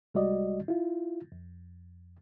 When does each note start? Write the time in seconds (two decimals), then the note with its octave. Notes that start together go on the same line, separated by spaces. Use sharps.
0.14 C2 G3 G#3 F#4 D5 D#5
0.68 E4 F4
1.32 F2